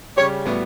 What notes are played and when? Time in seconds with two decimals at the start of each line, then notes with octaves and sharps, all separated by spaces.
0.16 C#3 G3 C#4 G4 C#5
0.46 A2 G3 B3 F#4